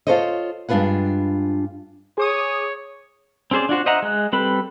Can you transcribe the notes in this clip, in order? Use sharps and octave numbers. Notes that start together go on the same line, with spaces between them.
F4 F#4 A4 C5 C#5 D#5
G2 G#3 D4 F4 B4 F#5
G#4 C#5 D6 D#6
C4 C#4 G#4 C5 D5
D4 F4 F#4 C5
C5 D#5 E5 F#5 A#5
G#3 F#6
G3 C4 A4 B4 B5